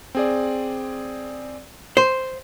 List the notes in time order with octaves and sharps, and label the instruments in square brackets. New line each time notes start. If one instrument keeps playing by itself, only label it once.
[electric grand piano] C4 G#4 D5
[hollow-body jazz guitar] C5